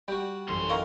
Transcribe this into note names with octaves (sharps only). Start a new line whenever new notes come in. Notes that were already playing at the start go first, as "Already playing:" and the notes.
G3 F#4 G5
A1 F#2 D3 C6
D#3 A#4 F5 C#6